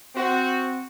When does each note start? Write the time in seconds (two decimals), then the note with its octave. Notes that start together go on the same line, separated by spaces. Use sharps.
0.15 C4 F#4